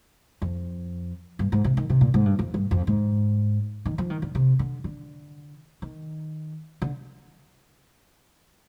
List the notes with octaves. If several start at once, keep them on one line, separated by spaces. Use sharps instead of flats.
F2
G2
G#2
C3
D#3
C3
A#2
G#2
G2
F2
G2
F2
G#2
D#3
F3
D#3
D3
C3
D3
D3
D#3
D3